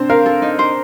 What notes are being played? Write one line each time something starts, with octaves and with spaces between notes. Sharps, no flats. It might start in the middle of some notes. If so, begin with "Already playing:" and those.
Already playing: C4 D4 C5
A#4 F5
A4
D#4
C5